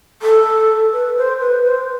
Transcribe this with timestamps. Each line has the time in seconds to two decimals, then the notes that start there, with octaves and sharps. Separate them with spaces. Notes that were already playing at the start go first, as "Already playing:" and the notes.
0.22 A4
0.92 B4
1.17 C5
1.40 B4
1.64 C5